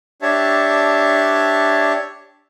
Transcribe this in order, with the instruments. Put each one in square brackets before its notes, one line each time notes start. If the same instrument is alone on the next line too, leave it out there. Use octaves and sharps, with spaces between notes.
[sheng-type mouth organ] D4 G4 C#5 E5 A5